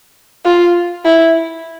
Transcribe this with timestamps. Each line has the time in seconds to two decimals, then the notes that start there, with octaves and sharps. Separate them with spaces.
0.45 F4
1.04 E4